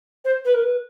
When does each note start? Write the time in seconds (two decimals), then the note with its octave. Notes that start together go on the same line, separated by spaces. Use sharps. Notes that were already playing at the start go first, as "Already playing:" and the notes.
0.25 C5
0.45 B4
0.54 A#4
0.63 B4